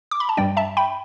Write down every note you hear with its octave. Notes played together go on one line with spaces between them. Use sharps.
D6
B5
A5
G2 G3 D4 D5 G5
E5 A5
G5 B5